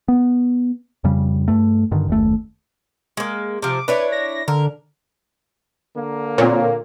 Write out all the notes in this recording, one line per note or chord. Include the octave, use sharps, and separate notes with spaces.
B3
F2 C#3 G3
G2 A3
G2 D3 D#3
F#1 D#2 A3
G#3 A#3
C3 F3 D6
D4 E4 B4 C#5
A#6
D3 A#4
D3 A#3
A#2 C4 A#4 C#5